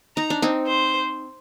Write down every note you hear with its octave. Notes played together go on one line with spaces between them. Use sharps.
D#4 A#5
D4
C4 D#4
C5